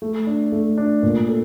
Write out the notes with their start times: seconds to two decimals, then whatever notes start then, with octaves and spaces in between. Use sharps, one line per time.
0.02 A3
0.27 D4
0.52 A3
0.78 D4
1.03 A#2
1.29 A4